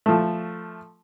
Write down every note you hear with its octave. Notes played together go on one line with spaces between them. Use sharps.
F3 A3